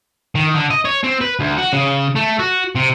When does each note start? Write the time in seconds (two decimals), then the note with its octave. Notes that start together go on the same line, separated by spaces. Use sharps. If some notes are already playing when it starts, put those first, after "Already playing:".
0.35 D#3
0.54 D3
0.71 D#5
0.85 C#5
1.04 C4
1.21 B4
1.40 D2
1.58 F#4
1.73 C#3
2.16 A3
2.39 F#4
2.76 C3